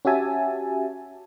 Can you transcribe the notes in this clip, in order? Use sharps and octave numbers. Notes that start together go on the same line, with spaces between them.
C#4 F#4 G4 E5 G#5 A5